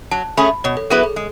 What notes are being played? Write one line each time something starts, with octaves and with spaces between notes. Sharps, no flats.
F#3 A5
A3 C#4 G#4 B5
B2 C#5
A4
F#3 B3 E4 G#4 B4
A4
G#3